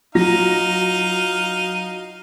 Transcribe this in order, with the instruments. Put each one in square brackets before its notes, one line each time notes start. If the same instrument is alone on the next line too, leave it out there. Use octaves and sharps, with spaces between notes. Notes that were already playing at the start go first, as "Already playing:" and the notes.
[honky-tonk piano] F#3 F4 A#6 [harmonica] D#4 F5